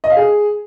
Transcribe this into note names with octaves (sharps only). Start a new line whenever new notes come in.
D#5
F5
G#4